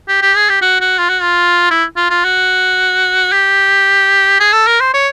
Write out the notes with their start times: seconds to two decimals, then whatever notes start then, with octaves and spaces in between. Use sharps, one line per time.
0.08 G4
0.22 G4
0.36 G#4
0.49 G4
0.62 F#4
0.81 F#4
0.98 F4
1.09 F#4
1.22 F4
1.70 E4
1.97 F4
2.10 F4
2.24 F#4
3.32 G4
4.40 G#4
4.53 A4
4.67 A#4
4.80 C5
4.94 C#5